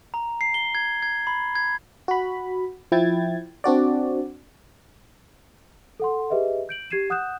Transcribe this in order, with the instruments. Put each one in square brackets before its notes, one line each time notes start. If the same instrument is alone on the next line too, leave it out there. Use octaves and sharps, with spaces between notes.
[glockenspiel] A#5
C7
G7
G#6
G#6
B5
G#6
[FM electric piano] F#4 B5
F3 E4 G5 G#6 A6
C4 D4 F#4 D5
[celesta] A4 F#5 C6
G4 G#4 B4 D#5 E5
G6 D7 F#7
G4 G#6 C7 D#7 E7
F#5 D#6 F#6 G6 E7